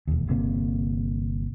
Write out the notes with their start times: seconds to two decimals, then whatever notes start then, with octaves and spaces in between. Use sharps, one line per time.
0.07 E1 D#2
0.28 G1 C3 A#3